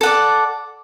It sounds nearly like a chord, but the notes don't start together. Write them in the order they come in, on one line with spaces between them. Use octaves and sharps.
A4 F#5 D5